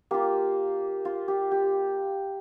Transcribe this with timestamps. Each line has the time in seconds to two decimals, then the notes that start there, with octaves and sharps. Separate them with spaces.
0.11 A#3 F4 G4
1.05 F4
1.28 G4
1.51 G4